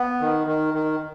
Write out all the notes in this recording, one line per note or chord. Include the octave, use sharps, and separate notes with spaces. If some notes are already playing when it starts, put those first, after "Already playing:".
Already playing: B3
D#3
D#3
D#3